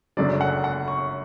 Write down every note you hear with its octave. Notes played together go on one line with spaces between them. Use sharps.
F#1 F#2 D3 F#3 D5
F#5
F#5
C#6